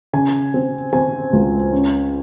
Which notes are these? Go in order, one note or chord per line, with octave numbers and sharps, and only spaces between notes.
C#3 G#5
C4
C4 G#5
C#2
C#4